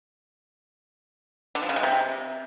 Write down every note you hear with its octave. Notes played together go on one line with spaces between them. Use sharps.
D3
F3
C#3
G#3
C3